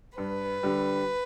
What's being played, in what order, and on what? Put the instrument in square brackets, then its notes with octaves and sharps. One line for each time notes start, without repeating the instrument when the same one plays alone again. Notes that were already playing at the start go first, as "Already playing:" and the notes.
[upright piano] G2 [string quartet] B4
[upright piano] D3 G3